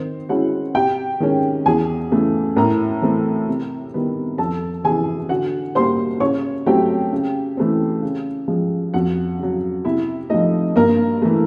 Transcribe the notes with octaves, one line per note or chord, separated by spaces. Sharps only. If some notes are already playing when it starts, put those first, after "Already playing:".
Already playing: D#3 C4 C5
G#3 C#4 E4 F#4 F#5
C3 G4 G5
D#3 G#3 C#4
E2 G#4 G#5
C#3 E3 A3
A2 A#4 A#5
E3 A3 C4
C3
D#3 G3 B3
F2 A4 A5
C3 E3 G#4 G#5
D3 F#4 F#5
G3 A#3 C5 C6
C#3 C#5 C#6
F#3 A3 C4 G4 G5
C#3
E3 A3 C4
C#3
F3 G#3
F2 F#4 F#5
C#3 F#3
C3 E4 E5
F3 A3 D#4 D#5
G2 A#3 A#4
E3 A3